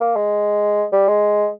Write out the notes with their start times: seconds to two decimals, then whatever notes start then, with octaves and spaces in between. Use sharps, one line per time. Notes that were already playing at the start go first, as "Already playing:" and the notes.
0.01 A#3
0.16 G#3
0.92 G3
1.08 G#3